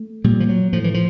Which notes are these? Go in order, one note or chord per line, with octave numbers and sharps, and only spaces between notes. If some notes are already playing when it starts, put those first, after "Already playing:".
Already playing: A3
A#2 G3
F3
F#3
A2 F3
E3
F3